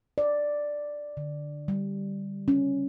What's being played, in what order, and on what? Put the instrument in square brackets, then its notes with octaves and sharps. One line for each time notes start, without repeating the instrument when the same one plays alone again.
[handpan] D5
D3
G3
C#4